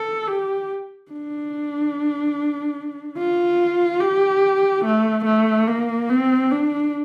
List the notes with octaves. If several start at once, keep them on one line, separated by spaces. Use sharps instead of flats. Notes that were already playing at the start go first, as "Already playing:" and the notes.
Already playing: A4
G4
D4
F4
G4
A3
A3
A#3
C4
D4